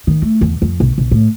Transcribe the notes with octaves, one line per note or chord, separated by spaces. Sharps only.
D#3
A3
E2
F2
B1
B1
A2